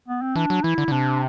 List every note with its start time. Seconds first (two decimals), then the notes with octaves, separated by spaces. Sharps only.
0.08 B3
0.22 C4
0.36 E3 D4
0.50 F#3
0.63 E3 E4
0.78 D3
0.88 D3
0.91 C3 D4